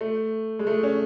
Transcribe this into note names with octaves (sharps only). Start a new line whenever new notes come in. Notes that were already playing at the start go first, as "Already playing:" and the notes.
A3
G#3
A3
C#4